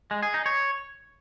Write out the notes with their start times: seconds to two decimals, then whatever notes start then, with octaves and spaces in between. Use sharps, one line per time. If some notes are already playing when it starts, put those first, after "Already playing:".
0.11 G#3
0.23 G#4
0.34 D#4
0.46 C#5